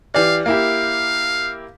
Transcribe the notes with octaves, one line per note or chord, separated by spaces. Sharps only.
E3 G4 D5 F5
A#3 E4 G4 F5